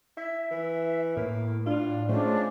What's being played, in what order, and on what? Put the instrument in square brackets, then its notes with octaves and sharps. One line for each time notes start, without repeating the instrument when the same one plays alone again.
[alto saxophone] E4 [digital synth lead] E5
[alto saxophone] E3
[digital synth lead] A2 [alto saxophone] A#3
[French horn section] D4 [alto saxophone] F4
[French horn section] G#2 C#4 F4 [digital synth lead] A3 [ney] D4 [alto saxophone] C5